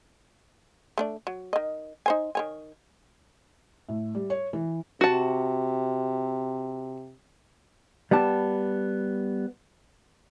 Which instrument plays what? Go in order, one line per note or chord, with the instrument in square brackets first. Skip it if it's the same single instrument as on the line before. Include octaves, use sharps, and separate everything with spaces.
[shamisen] A3 D4 D5
F#3
D#3 D#5
D#4 C5 G#5
D#3 C#5 G#5
[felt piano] A2
G3
C#5
E3
[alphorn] C3 [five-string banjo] F#4 A5
[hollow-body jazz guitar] G3 B3 G4 A5